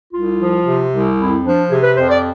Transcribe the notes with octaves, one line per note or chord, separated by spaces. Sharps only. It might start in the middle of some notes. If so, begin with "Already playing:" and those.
C2 F4
F3
C3
C2
F2 E4
F3 D4
C3 G#4
B4
F2 C5
D5